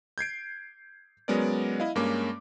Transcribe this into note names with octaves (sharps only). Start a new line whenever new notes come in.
G6 G#6 C7 D7
F#3 G#3 B3 C#4 A#4 D5
E4 D#5 F5
G2 G#3 A#3 C#4 D6